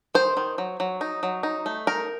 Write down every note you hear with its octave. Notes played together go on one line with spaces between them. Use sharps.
D#3 C5
D#3
F#3
F#3
D#4
F#3
D#4
A3
D#4 A#4